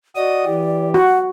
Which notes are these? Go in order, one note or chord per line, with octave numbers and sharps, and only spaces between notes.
F#4 D5 D#5 D#6
E3 G4
F#4 F#5